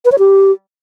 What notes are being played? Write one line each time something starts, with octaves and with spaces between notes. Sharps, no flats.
B4
C#5
G4